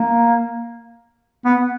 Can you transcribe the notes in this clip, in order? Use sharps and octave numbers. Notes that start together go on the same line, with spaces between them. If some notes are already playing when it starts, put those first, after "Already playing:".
Already playing: A#3
B3